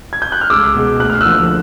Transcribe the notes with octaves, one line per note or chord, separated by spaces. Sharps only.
G#6
G6
F#6
F6
C#2 D6 E6
B2 G#3
D2 F#6
F6
D3 F3 A#3 E6 F#6